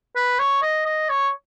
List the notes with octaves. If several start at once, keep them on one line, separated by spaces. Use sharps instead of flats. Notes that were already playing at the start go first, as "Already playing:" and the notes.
B4
C#5
D#5
D#5
C#5